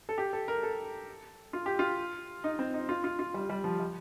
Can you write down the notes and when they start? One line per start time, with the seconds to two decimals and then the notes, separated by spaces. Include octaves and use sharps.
0.09 A4
0.18 G4
0.33 A4
0.48 A#4
0.63 A4
1.53 F4
1.66 G4
1.79 F4
2.44 D#4
2.59 C4
2.74 D#4
2.89 F4
3.04 F4
3.19 F4
3.34 G3
3.50 G3
3.64 F3
3.80 G3